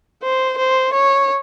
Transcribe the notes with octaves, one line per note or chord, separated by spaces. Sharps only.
C5
C5
C#5